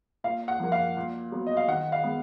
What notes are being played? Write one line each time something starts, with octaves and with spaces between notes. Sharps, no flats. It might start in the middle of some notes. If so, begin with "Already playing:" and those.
A#2 F5
F#5
F3 A#3
F5
A#2
F#3 B3
D#5
F5
D#3 F#5
F5
G#3 B3